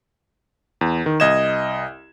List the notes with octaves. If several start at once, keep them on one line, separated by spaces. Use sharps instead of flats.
E2
D#3
C2 D#5 G#6 E7